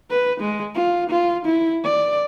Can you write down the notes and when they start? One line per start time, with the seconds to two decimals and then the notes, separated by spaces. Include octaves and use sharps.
0.10 B4
0.40 G#3
0.75 F4
1.10 F4
1.45 E4
1.84 D5